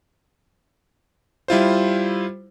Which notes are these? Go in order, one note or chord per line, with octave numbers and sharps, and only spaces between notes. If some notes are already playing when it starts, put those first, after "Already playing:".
G3 E4 F4 C5